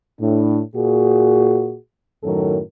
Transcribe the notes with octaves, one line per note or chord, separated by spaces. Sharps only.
A2 D4
A#2 F#4 G#4
F#2 A2 D#3 F#3 A4 A#4